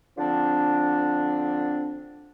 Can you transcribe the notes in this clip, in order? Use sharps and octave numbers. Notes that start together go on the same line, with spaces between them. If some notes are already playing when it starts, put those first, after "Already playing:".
D3 F3 C4 D4